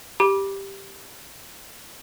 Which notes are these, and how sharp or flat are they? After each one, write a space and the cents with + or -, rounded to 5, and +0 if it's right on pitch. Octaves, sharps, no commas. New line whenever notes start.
G4 +5 B5 -30 D6 +0